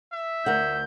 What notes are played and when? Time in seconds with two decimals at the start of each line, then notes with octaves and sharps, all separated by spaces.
0.12 E5
0.46 D2 A#4 F#5 G6